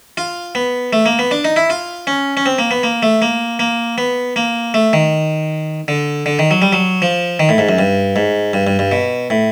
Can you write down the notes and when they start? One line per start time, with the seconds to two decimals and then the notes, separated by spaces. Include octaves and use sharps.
0.17 F4
0.55 B3
0.93 A3
1.06 A#3
1.19 B3
1.31 D4
1.45 D#4
1.56 E4
1.70 F4
2.07 C#4
2.37 C#4
2.46 C4
2.58 A#3
2.71 B3
2.83 A#3
3.03 A3
3.22 A#3
3.59 A#3
3.98 B3
4.36 A#3
4.74 A3
4.93 D#3
5.88 D3
6.26 D3
6.39 D#3
6.51 F#3
6.62 G3
6.73 F#3
7.02 F3
7.40 D#3
7.49 A2
7.58 G#2
7.69 F#2
7.79 G2
8.16 G#2
8.53 G2
8.67 G2
8.79 G2
8.92 B2
9.30 A2